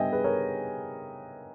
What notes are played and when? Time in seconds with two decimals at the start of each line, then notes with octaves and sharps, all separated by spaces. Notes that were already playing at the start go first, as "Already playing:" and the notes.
Already playing: G2 G3 B3 D#5 E5 G5 G#5
0.12 G#4 B4
0.24 A#4 C#5